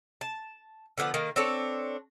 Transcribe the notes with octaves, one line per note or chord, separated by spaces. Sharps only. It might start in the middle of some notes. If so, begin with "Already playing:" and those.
A5
D3 F3 B3 D5
D#3 A#3
C4 D4 A4 C#5